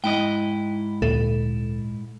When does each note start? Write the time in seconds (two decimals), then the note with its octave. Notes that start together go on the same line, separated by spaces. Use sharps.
0.04 G#2 E4 D#5 G5
1.02 D2 A#2 A4